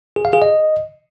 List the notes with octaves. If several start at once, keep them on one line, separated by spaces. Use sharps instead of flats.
G#4
F5
G#4
D#5